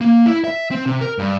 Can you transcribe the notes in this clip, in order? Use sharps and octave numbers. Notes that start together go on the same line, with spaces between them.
A#3
E4
E5
C4
C3
A#4
G2